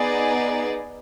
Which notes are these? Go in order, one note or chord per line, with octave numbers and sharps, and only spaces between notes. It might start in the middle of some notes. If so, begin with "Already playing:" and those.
Already playing: B3 D#4 G#4 D5